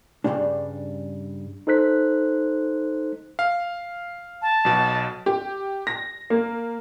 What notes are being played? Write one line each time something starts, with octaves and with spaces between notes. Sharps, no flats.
G2 C#3 F3 G3 A#3 D4
D#4 A4 C5 F#6 B6
F5
A5
B1 B2
G4
A#6
A#3